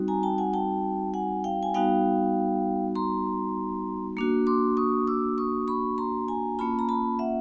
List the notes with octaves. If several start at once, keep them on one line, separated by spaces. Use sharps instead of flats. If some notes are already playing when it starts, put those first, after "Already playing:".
Already playing: G3 C4 D#4 F#4
G#5 A#5
G5 A5
F#5 G#5
G5 A5
F#5 G#5
F5 G5
G#5
G3 B3 D#4 F#4 F5 G5
A#5 C6
A#3 D4 F#4
C6 D6
C#6 D#6
D6 E6
C#6 D#6
B5 C#6
A#5 C6
G#5 A#5
A#3 C#4 F4 A5 B5
A#5
A5 B5
E5 F#5